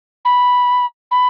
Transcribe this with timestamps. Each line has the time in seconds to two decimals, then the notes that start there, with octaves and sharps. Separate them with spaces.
0.25 B5
1.11 B5